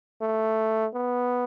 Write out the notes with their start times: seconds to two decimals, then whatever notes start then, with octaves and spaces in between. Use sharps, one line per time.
0.22 A3
0.94 B3